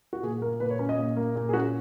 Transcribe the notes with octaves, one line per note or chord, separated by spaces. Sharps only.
F#4
A#2 G#4
A#3 A#4
A#2 B4
C#5
C#4
D#5
A#2
A#3
A#2
G#4
C#4 F#4